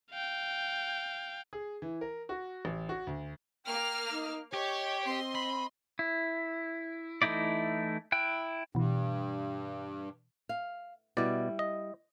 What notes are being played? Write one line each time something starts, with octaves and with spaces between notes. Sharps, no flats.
F5 G5
G#4
E3
A#4
F#4
A1
F#4
D2
A#3 G5 D6 F6
D#4
G4 C#5 D#5
C4 D#5 C6
B5
E4
E3 A3 D#4 E4 D5
E4 G5 F#6
G2 B2 E3
F5
B2 G3 E4 D5
D#5